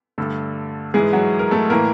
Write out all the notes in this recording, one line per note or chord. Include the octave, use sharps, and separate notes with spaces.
G2 D3 A3 A4
G#2 E3 G#3 G#4
F#3 F#4
A#4
A3 A4
A2 E3 A#3 A#4